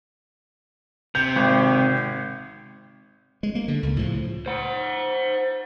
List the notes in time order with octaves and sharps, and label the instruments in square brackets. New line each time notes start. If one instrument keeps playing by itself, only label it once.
[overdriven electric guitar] C3 [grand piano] G6
[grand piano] G#1
[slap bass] G#3
A#3
D3
C#2
A2 C#3 F3
[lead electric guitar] C5 F#5